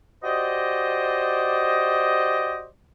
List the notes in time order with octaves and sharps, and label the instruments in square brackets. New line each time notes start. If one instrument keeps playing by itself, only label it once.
[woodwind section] F#4 G4 C5 D5 D#5